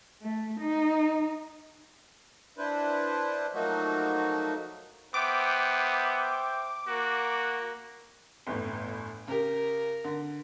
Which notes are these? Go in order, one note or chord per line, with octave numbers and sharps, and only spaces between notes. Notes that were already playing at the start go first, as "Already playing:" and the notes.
A3
D#4
D4 E4 B4 C5
F3 F#3 A3 A#3 D#4 F#4
B3 C5 E5 G5 D6
A#3 F#4
G1 E2 A2
C#3 G4 A#4
D3